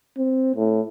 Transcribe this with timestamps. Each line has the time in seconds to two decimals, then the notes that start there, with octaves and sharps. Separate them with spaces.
0.17 C4
0.55 A2